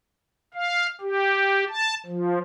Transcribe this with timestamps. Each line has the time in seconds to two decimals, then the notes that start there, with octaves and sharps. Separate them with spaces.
0.54 F5
1.01 G4
1.69 A5
2.06 F3